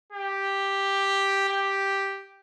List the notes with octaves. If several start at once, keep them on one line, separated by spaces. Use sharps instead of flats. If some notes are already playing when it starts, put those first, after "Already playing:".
G4
G4